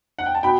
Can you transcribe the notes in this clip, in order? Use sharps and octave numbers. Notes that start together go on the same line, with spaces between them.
F#5
G5
A5
B2 G5 B5